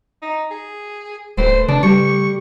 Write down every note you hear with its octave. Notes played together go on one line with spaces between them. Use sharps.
D#4
G#4
D1 A3 B4 C5
C#3 D4
G3 C#6